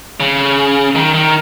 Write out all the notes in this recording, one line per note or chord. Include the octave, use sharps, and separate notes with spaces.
C#3
D#3
D#3